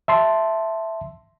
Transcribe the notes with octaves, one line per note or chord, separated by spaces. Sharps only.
E5 A5 C6